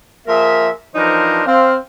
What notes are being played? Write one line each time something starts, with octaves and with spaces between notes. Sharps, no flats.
F3 A#3 G#4 A#4 E5
E3 F3 D4 D#4 A#4 C5
C4 F5